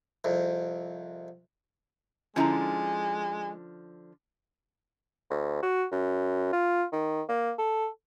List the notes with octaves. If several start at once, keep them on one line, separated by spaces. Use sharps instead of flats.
C2 F2
D3 F3 G#3 C#4 E4 A#5
D2
F#4
F#2
F4
D#3
A#3
A4